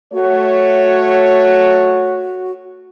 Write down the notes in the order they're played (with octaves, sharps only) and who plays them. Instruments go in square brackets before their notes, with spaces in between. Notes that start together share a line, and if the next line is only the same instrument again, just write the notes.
[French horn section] A3 C#5 [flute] F#4